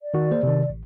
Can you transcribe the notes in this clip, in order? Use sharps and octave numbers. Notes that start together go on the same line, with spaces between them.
D5
D#3 F#4
A#3 G#4 C5
C3 D#3
A1